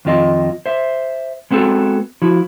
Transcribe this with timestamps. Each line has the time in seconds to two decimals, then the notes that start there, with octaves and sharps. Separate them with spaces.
0.05 F2 D#3 C4 F4 D#5
0.66 C5 E5
1.51 G#3 B3 C4 F#4 A4
2.22 F3 E4 F#4